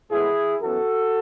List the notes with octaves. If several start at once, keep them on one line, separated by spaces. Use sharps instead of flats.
A2 G#3 B3 E4 G#4
F#2 E3 B3 F#4 A4